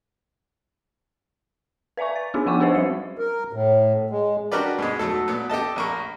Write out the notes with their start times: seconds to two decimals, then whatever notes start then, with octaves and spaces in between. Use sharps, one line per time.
1.97 B4 D5 E5 G#5 C#6
2.16 A6
2.34 B3 D4 D#4 F4 G4 G#4
2.46 F3 D4 F#5 G5 C#6 D6
2.60 D4 G4 B4 C5 D#5
2.75 F#3 G3 F#4 C#7
3.18 A#4
3.53 A2
4.10 G#3
4.52 D4 F#4 G4 A#4 B4 D5
4.78 G#2 B2 G#3
4.99 F#3 A3 A4
5.28 A#2 B3
5.50 G4 A4 D#5 A5
5.76 A#1 A#3 C#6